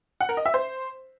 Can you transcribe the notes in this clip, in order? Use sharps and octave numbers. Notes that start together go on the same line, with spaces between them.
F#5
A#4
D#5
E5
C5